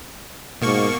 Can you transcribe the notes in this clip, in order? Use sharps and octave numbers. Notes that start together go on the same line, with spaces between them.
G#2 B2 A#3 C#6